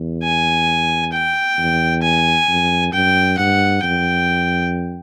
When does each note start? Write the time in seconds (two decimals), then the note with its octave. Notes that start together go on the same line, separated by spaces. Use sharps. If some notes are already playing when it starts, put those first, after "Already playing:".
Already playing: E2
0.23 G#5
1.13 G5
1.59 E2
2.03 G#5
2.49 F2
2.93 F#2 G5
3.38 G2 F#5
3.83 F2 G5